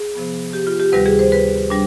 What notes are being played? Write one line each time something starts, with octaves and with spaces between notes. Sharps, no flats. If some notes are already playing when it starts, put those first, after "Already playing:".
Already playing: G#4
C3 F3 B3
G4
F4
G4
D2 C3 D#3 G3 B4
G#4
C5
B4
G3 D4